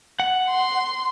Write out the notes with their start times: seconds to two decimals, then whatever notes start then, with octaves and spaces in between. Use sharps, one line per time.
0.20 F#5
0.50 C6